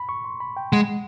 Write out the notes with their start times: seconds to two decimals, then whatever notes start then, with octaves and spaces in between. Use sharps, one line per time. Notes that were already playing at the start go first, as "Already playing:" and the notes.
Already playing: B5
0.09 C#6
0.25 C6
0.40 B5
0.57 G5
0.73 G#3 F#5